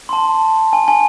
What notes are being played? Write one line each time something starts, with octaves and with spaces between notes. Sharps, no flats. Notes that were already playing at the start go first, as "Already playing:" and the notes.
C6
A5
G#5
G#5